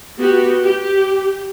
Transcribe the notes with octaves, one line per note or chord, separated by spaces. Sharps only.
B3 F#4 G4
G4